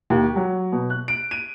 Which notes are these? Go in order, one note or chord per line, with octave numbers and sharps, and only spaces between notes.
D#2
G4
F#3
B2
F#6
D7
D#7